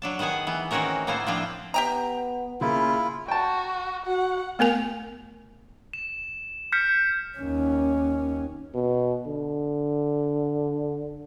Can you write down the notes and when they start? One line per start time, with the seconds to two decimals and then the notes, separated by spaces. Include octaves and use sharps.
0.02 F#3 D4 A5
0.19 D#3 B3 G#4 F#5 G#5
0.47 E3 B3
0.71 D#3 E3 C4 C#4 F#4 A#4
1.07 A2 A#3 B3 E4 F4 C5
1.27 F3 C4 D4 E4 F4
1.74 B3 G4 G5 A#5
2.61 C#3 A#3 C#4 E4 F4
3.28 F#4 G5 A5
4.06 F#4 F#5
4.59 A3 B3 A#4 G#5
5.93 E7
6.72 F6 G6 B6 C#7
7.38 D#2 C#4
8.74 B2
9.26 D3